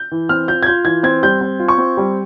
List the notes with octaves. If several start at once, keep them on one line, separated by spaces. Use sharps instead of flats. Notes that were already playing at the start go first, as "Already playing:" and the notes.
Already playing: G6
E3
C4 F6
F4 G6
G#6
F4 G6
E3 G#6
C4 G#6
G3 G6
C4
F4
C#6
C4
G3